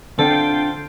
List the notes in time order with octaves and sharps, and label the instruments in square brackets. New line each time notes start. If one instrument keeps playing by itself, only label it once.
[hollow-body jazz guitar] D3 C4 D4 [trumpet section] F4 G5 [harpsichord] A4